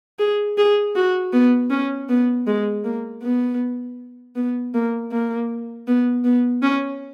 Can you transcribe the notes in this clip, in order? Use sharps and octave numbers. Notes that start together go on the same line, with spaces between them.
G#4
G#4
F#4
B3
C#4
B3
G#3
A#3
B3
B3
A#3
A#3
B3
B3
C#4